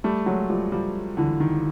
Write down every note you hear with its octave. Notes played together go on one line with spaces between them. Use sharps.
G3 A3
F#3 G#3
F3 G3
F3 G3
D3 E3
D#3